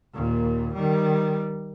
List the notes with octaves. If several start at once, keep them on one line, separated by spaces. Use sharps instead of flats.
D#2 A#2
D#3 G3